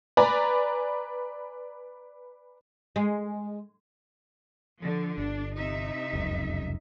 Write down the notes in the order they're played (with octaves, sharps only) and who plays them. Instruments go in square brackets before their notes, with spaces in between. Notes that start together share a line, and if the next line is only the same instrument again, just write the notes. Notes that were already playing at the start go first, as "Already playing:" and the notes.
[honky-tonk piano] B4 D5 G#5 A#5 B5
[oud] G#3
[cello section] D3 F3
[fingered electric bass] G1 [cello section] D4
[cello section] C3 D#4 E5
[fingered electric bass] F1 C#2 F#2